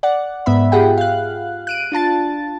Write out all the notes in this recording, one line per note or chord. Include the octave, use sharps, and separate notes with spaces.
D5 F#5
G#2 B3 E5 B5
F4 G4 G#4 F#5 G5
F5 F#6
F#6 D7 D#7
D4 F4 A5 A6